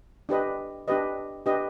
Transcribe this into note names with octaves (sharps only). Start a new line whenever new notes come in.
D4 G4 B4 D#5
D4 G4 B4 D#5
D4 G4 B4 D#5